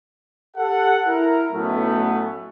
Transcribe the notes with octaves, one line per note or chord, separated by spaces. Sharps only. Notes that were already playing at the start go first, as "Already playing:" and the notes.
G4 A4 F#5
E4 A#4
B1 A2 F#3 A3 B3 C#4